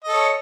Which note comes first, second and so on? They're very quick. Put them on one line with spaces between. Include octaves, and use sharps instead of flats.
D#5 A4 C#5